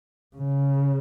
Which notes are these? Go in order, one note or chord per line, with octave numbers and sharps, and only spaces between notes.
C#3